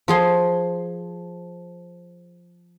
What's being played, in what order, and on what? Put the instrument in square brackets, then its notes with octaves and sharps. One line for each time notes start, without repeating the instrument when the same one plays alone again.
[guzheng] F3 G#4 C6